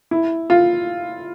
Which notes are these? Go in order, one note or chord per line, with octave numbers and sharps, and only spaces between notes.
E4
F4